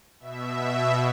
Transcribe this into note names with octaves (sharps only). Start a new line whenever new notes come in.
B2 E5